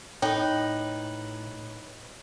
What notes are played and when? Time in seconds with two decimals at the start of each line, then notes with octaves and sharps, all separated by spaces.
0.22 A2 D#4 A4 B4 C#5 G5